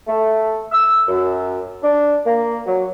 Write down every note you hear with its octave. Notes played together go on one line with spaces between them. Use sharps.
A3
E6
F#2
D4
A#3
F#3